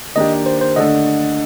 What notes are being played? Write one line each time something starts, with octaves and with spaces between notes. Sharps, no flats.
D#3 A#3 D4 G4 D#5
C5
C5
D3 A3 D4 A4 D#5